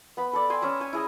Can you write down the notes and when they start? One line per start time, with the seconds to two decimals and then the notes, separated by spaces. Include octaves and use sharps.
0.17 B3 B5
0.33 A4 D5
0.50 G5 G#5 C6 E6
0.62 C#4 C#5 E5 A#5
0.80 C#5 G#5
0.93 E4 G#4 D#5